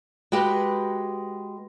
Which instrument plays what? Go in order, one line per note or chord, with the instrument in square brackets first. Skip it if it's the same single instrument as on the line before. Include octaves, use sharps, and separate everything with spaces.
[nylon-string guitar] G#3 F#4 G4 B4